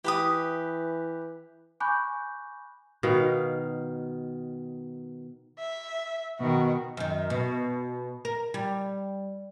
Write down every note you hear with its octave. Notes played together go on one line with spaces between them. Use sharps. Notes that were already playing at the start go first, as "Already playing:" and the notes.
E3 G4 B4 D#6
G#5 B5 C#6 D6 F#6 G6
B2 D#3 F5
E5
B2 D#3 F#4
F#2 D#3
B2
A#4
G3